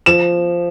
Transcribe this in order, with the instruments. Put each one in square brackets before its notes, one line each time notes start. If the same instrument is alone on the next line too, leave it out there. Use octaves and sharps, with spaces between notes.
[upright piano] F3 E7